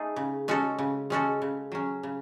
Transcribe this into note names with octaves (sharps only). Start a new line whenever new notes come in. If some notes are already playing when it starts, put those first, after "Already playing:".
Already playing: A3 D#4 G#4
C#3
G#3 C#4 F#4 A4
C#3
G#3 C#4 F#4 A4
C#3
F#3 C#4
C#3